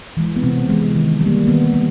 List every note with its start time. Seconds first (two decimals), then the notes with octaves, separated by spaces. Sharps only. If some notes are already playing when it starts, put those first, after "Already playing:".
0.17 E3 G#3
0.36 B3
0.43 C3 C4
0.69 E3 G#3
0.95 D#3
1.21 G3 A#3
1.47 D#3 B3
1.74 G3